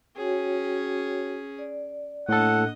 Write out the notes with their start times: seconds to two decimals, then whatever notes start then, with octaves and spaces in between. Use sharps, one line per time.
0.16 C#4 F#4 G#4 C#5 G5
1.59 D5
2.29 A2 A#3 D4 A4 D#5 F#5